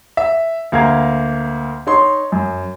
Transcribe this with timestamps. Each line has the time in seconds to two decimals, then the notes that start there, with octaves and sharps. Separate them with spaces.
0.17 E5
0.72 D2 A#3 F5 A#5 G#6
1.87 D#4 C#5 C6
2.32 F#2